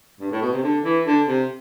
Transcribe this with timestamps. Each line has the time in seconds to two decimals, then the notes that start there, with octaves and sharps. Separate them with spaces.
0.20 G2
0.32 A2
0.42 B2
0.53 C3
0.63 D3
0.85 E3
1.06 D3
1.28 C3